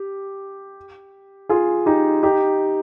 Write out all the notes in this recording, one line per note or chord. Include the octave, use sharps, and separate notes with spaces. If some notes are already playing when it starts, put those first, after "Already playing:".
Already playing: G4
F4 G#4
D#4 G4
D#4 G4